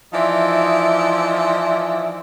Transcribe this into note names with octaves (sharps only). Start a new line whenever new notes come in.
E3 F3 D#4 C5 D5 E5